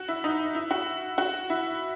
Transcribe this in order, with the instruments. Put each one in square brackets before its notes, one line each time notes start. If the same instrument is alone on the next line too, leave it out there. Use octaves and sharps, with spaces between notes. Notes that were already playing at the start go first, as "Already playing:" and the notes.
Already playing: [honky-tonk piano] F#4
E4
D#4
E4
F#4
F#4
E4